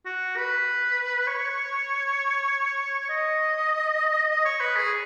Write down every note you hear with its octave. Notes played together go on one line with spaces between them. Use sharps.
F#4
B4
C#5
D#5
D#5
C#5
B4
G#4